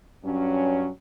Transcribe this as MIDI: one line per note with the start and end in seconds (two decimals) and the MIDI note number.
0.24 0.88 43
0.24 0.88 54
0.24 0.88 61